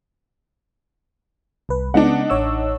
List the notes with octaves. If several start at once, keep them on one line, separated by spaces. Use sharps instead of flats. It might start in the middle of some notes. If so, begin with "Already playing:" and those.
C2 B4
C#3 G#3 B3 D4 D#4 F#5
A1 C#5 E6